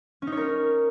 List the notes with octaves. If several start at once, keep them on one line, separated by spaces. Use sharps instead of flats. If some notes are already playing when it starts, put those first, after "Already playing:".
C#4
D#4
C#5
A#4